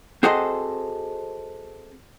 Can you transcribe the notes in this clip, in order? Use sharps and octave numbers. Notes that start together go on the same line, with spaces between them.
C4 F#4 G#4 A4 C5 D#5